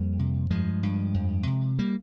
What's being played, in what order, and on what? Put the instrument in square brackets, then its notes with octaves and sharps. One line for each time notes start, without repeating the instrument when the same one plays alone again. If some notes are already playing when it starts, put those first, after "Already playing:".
Already playing: [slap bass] F2 G3 A#3
C3
G2 F3 G#3
G2
F2
C3
G3 A#3